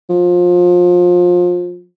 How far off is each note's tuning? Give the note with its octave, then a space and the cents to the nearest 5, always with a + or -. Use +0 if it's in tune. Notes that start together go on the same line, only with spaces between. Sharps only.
F3 +25